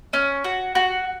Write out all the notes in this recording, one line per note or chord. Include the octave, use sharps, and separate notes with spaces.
C#4
F#4
F#4